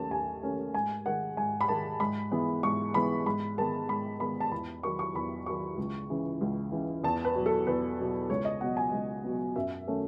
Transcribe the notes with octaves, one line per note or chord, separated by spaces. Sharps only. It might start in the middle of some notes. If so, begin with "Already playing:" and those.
Already playing: D#2 D#3 A3 C#4 A5
D#2 G#5
D#3 A3 C#4
G#2 G#5
D#3 G#3 F#5
G#2 G#5
B5
D#3 G#3 A5
G#2 B5
E3 G#3 B3
G#2 C#6
E3 G#3 B3 B5
G#2 B5
D#3 G#3 B3 A5
G#2 B5
D#3 G#3 B3 B5
A5
E2 B5
D#3 F#3 C#6
C#6
E2 B5
D#3 F#3 C#6
C#2
C#3 E3
C#2
C#3 E3
E2 A5
B4
B2 F#3
A4
E2 B4
B2 F#3
C#2 C#5
D#5
B2 F#3 B3 F#5
G#5
C#2
B2 F#3 B3
F#2 E5
D#3 A3 C#4